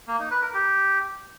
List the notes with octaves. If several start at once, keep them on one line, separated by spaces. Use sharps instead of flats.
A#3
D#4
B4
A#4
G4